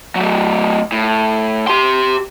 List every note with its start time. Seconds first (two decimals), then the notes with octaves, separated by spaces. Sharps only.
0.15 F#3 A3
0.92 A2
1.68 G4 C6